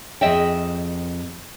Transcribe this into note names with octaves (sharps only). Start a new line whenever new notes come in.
F2 G#4 D#5 E5 G5